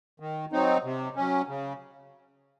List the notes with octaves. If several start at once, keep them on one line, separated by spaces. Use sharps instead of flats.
D#3
F#3 C4 D#4
C3
F#3 C#4
C#3